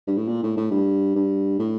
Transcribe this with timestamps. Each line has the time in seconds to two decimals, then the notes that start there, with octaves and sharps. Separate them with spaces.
0.07 G2
0.17 A2
0.28 A#2
0.43 A2
0.57 A2
0.71 G2
1.15 G2
1.59 A2